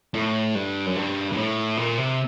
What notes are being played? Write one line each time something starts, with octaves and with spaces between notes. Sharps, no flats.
A2
G2
F#2
G2
G2
A2
A#2
C3